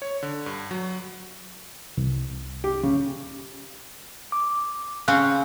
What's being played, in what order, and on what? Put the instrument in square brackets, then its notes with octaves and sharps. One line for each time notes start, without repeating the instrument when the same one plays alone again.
[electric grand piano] C#5
D3
G2
F#3
[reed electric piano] C2
[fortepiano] G4
C#3
[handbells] D6
[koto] C#3 C4 C#4 [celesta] F5 [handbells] F#6